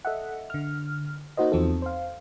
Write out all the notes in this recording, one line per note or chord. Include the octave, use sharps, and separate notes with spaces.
A4 D#5 E5 F#5
D3 F6
A#3 D#4 F#4 C5 D#5
E2 F3 C4 D#4 A4
C5 F5